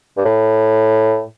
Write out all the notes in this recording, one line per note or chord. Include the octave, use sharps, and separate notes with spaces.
G2
A2